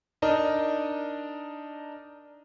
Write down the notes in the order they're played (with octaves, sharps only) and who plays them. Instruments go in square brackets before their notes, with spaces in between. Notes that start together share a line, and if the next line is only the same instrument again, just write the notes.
[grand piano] D4 D#4 A#4 D5 D#5